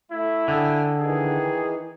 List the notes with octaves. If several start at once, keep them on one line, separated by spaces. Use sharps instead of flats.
A3 E4
D3 D#5 G5 G#5
D#3 E3 D#4 G#4